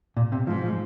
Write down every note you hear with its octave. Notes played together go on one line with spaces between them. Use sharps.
A#2
C3
G#2 F3
F3